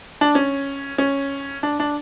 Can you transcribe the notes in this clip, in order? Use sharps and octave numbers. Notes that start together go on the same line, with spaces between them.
D4
C#4
C#4
D4
D4